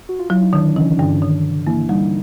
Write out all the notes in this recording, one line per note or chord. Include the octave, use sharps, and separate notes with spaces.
F#4
F4
F#3 E4
D#4
D3 D#3 D4
C#3 E3 C#4
G2 D3 D4
D#3
C3
E3 A#3 E4
D#3 G3 D#4